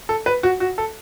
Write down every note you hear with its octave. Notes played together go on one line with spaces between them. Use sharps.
A4
B4
F#4
F#4
A4